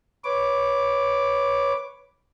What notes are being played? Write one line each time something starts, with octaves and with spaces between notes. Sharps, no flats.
B4 C#5 D6